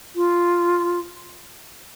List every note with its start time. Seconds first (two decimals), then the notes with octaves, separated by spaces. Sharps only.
0.16 F4